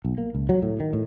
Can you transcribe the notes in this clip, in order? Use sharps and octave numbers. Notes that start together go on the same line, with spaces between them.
B1
A#3
C#2
F#3
A2
D#3
A2